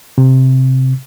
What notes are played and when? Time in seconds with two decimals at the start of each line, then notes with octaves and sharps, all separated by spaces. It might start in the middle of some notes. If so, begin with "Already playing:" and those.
0.18 C3